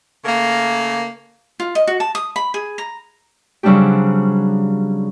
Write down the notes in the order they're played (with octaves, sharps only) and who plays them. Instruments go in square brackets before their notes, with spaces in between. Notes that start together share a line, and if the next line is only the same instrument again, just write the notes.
[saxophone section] C#3 A3 A#3
[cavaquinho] F4
D#5
F#4
A5
D#6
B5
G#4
A#5
[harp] C#3 F#3 G3 C4 D4 G4